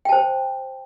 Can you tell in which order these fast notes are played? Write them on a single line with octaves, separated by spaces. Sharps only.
G5 A5 C5